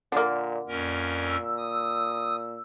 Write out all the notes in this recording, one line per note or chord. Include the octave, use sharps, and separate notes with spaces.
A#2 D3 A#3
F2 A#2 C#4 A#4
E6
D#6